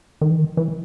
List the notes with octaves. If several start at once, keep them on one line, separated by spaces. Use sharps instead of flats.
D#3
E3
D#3
E3